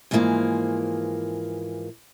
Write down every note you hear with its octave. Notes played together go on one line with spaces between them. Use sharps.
G#2 E3 F3 G3 A#3 G#4